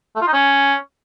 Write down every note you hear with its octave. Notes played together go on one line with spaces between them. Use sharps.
A3
F4
D#4
C#4